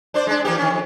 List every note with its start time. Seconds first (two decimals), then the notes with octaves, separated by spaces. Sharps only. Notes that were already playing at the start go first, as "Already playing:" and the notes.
0.14 D4 C5 D5
0.27 G#3 D4
0.45 E3 A#3 G4
0.58 D#3 C#4
0.70 F2